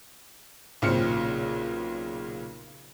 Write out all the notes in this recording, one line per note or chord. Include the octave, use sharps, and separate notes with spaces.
B1 A#2 C#3 C4 F6 C#7